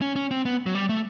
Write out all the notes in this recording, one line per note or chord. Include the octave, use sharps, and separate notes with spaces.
C#4
C#4
C4
B3
F#3
G3
A3